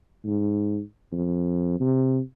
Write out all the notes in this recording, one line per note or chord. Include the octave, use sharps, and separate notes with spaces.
G#2
F2
C3